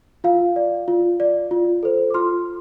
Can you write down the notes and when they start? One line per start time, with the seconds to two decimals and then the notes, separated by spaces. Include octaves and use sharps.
0.24 F4 F5
0.56 D5
0.88 F4
1.20 D5
1.51 F4
1.83 A4 C5
2.10 D6
2.14 F4 C6 F6